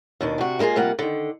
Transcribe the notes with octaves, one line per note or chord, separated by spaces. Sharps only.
D#2 B2 D4
C3 F#4
G#3 A#3 D#4 F4 G#4
C3 G3 A#3 F4 F#5
D3 D#3